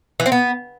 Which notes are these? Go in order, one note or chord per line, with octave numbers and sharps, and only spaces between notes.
E3
C4
B3